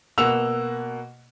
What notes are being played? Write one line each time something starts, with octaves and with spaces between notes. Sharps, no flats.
B2 A#3 F#5 E6 F7